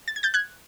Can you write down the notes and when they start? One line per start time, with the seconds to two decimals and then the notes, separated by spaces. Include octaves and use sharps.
0.08 A6
0.16 G#6
0.23 G6 A6
0.34 F#6 G#6